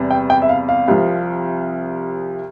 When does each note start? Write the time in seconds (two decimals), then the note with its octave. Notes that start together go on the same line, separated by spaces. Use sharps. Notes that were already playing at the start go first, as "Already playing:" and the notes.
Already playing: E2 C3 G3
0.10 G5
0.30 G5
0.42 E5
0.49 F5
0.69 F5
0.88 C2 C3 F3